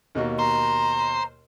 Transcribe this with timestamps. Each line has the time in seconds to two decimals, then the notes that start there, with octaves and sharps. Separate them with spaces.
0.15 D#2 B2 A#3
0.39 C5 A#5